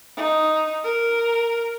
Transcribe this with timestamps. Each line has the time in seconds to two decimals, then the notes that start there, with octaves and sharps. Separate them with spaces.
0.17 D#4
0.84 A#4